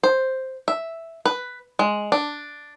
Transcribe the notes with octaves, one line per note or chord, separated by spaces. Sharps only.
C5
E5
B4
G#3
D4